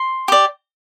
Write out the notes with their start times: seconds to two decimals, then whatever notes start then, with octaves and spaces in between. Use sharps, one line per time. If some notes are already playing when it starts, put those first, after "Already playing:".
Already playing: C6
0.28 G4 D5